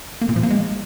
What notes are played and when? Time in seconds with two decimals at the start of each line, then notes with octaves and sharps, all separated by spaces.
0.21 A#3
0.29 A#2
0.36 F3
0.43 A#3
0.50 G#3